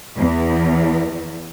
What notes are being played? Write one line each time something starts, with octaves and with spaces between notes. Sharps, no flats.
E2